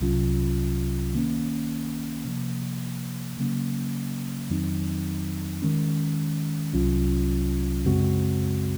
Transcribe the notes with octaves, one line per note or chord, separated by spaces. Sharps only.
C2 C3 F#3 C#4 F4
D#3 A#3 C#4
C3 F3 A#3
C#3 F#3 A#3 C#4
F2 D#3 F#3 C4 D#4
D#3 G#3 C#4
C2 C3 F#3 C#4 F4
F#2 C#3 G#3 C4 F#4